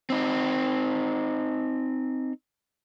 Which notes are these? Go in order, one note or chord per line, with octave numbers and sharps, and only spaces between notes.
C4 D#4